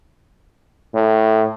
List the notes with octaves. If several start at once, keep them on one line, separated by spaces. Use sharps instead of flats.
A2